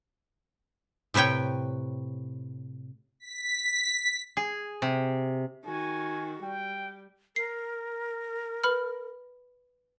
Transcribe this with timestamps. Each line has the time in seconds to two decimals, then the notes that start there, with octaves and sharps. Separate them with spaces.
1.14 A2 C3 B4 C#5 G5
3.20 B6
4.37 G#4
4.82 C3
5.65 D#3 F#4 G#5
6.43 G3 G5
7.36 A#4 C7
8.64 B4 B5 F6